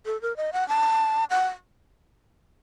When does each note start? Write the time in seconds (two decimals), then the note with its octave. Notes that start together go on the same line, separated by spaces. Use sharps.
0.06 A4
0.22 A#4
0.37 D#5
0.53 F#5
0.69 A5
1.30 F#5